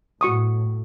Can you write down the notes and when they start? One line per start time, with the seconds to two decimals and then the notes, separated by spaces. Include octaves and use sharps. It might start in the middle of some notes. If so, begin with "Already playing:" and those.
0.21 A2 F#4 C#6 D#6